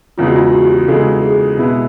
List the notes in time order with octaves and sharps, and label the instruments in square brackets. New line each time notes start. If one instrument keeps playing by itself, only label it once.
[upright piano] E2 C#3 E3 G#3 [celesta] F4
[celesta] F#4
F4
F#4
G4
[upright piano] E2 C#3 E3 G#3 [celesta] A4
[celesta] G#4
[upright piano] B2 G#3 B3 E4 [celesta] G4